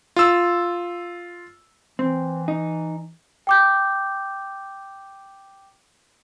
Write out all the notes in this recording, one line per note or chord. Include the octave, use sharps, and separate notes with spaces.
F4 E6
E3 C4
D#4
G5 D6 G6